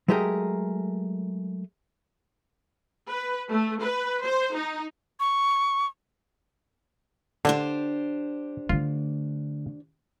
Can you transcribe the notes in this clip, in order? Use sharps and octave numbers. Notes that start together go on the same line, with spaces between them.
F#3 G#3 A3 G4 G#4 A#4
B4
A3
B4
C5
D#4
C#6
D3 D4 G4 C5
D3 A3 F4